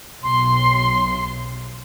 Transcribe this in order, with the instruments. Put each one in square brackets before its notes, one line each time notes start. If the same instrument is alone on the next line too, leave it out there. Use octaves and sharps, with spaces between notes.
[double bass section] B1 [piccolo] C6